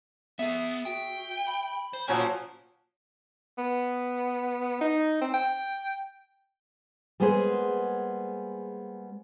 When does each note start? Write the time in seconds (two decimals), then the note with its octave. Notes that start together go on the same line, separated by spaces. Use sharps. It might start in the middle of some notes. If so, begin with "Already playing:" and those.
0.39 B3 G#4 E5
0.85 F#4 G5
1.47 B5
1.93 C5
2.08 A#2 F3 F#3 A#3 C#4 G#5 A5
3.58 B3
4.81 D#4
5.21 C4
5.33 G5
7.20 G3 G#3 A#3 B3 G#4 C5